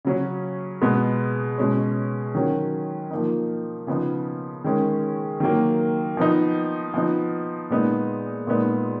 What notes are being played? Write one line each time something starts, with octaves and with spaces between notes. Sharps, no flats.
C#3 F#3 C#4
B2 G#3 B3
B2 G#3 C#4
D#3 F#3 C#4
F3 A#3 D#4
C#3 F3 B3 D#4
D#3 G#3 C#4
D#3 F#3 A#3
F3 B3 D#4
F3 B3 D#4
A#2 G#3 B3 D#4
A#2 G#3 B3 D#4